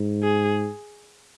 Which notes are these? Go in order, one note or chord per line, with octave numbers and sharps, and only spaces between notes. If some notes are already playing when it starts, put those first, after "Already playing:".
Already playing: G#2
G#4